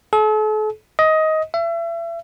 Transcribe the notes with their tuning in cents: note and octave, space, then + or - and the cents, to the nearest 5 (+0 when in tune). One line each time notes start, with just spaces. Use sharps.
A4 -40
D#5 +15
E5 +35